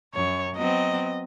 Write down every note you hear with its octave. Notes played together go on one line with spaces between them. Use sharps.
F#2 C#5
F#3 B3 C4 D#5